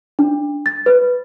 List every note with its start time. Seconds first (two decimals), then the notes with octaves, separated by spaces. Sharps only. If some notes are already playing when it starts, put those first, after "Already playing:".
0.19 D4
0.66 A6
0.86 B4